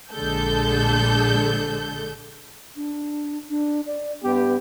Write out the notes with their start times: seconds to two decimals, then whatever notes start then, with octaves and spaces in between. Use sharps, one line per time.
0.13 A#1 D3 G#3 A4 G6
2.76 D4
3.50 D4
3.87 D5
4.23 G2 B3 G4